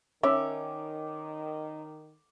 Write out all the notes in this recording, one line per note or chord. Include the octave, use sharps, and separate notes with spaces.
D#3 C#4 E5 D6